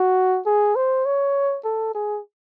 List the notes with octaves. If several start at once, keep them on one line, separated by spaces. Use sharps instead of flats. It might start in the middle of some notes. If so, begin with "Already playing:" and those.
Already playing: F#4
G#4
C5
C#5
A4
G#4